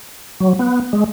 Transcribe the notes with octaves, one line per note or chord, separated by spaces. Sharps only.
F#3
B3
G#3